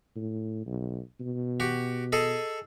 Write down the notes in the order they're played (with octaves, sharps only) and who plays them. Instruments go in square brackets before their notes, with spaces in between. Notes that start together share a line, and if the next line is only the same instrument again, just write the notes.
[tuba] A2
B1
B2
[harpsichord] F#4 G4
G#4 A4 D#5